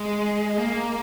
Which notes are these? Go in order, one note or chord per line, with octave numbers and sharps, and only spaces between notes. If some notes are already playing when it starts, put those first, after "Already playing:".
Already playing: G#3
A#3